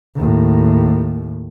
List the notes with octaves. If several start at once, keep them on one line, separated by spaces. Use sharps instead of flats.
D#2 A2